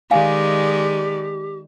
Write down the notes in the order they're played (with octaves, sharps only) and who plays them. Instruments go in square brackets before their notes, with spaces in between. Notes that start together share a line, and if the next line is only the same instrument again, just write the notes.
[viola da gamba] D#3 G#3 D5 [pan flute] G4 [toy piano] F5 G#5